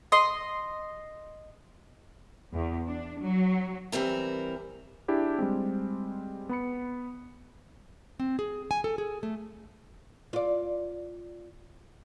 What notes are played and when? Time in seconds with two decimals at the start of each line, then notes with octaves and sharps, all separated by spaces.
0.12 D#5 C6
2.52 E2
2.86 D4
3.20 F#3
3.92 E3 G3 C4 A#4
5.08 D4 E4 G4 G#4
5.39 G3 G#3 C4
6.49 B3 B5 C#7
8.20 C4
8.39 G#4
8.71 G#5
8.84 A4
8.98 G#4
9.23 A3
10.33 F4 D5